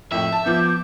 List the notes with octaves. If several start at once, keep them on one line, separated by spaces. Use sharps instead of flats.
F2 A2 E5
A5
F3 B3 D6 G6